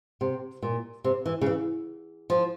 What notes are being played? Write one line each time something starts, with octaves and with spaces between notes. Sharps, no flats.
C3
A#2
C3
E3
C#3
E3
F3